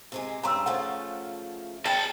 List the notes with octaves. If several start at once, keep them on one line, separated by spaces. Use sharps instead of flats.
C3 E3 G#3
G2 C#3 A#5 C6 E6
C#3 F3 A3 F#5
G#4 G5 A5